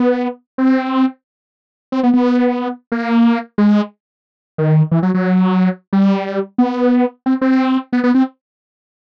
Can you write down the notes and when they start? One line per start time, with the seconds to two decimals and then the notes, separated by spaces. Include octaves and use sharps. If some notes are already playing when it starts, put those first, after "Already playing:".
Already playing: B3
0.58 C4
1.92 C4
2.03 B3
2.14 B3
2.92 A#3
3.58 G#3
4.58 D#3
4.91 E3
5.03 F#3
5.14 F#3
5.93 G3
6.58 B3
7.26 C4
7.41 C4
7.93 B3
8.04 B3
8.15 C4